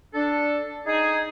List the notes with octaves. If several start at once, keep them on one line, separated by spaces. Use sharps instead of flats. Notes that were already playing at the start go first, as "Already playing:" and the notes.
D4 A4
D#4 G#4